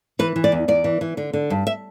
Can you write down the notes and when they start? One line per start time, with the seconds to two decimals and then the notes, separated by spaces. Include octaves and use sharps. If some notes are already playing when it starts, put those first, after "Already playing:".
0.19 E3 B4
0.36 E3
0.44 D5
0.52 E2
0.68 E2 D5
0.84 E3
1.01 E3
1.17 D3
1.33 D3
1.50 G2
1.67 E5